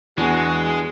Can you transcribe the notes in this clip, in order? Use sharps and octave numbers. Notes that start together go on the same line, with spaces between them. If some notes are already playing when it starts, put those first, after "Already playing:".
E2 E3 G#3 B3 D4 F#4 G#4